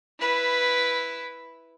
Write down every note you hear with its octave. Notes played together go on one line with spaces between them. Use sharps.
E4 B4